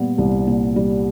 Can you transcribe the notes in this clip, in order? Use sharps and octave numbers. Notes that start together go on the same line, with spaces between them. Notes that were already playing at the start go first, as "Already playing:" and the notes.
Already playing: A#2 G3 B3
C2
A#2
G3